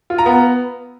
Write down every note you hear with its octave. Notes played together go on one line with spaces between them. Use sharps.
F4
A#5
B3